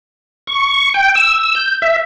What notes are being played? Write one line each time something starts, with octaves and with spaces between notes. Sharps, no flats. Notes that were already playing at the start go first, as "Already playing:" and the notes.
C#6
G5
E6
G6
E5